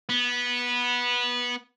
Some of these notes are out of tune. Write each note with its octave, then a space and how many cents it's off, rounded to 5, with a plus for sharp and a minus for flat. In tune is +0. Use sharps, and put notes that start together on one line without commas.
B3 -15